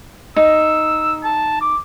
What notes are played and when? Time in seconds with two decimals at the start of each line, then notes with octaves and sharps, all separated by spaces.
0.36 D#4 E6
1.24 A5
1.61 D6